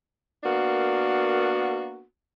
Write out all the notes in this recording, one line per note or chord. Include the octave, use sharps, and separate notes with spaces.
A#3 B3 D4 F#4 A#4